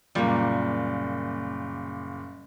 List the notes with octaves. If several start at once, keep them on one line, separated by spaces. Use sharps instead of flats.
F#1 A#2 G3 A#3